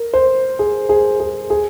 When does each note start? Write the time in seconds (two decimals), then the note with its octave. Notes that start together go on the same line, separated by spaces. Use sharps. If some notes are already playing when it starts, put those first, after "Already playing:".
Already playing: A#4
0.14 C5
0.59 G#4
0.89 G#4
1.20 G#4
1.50 G#4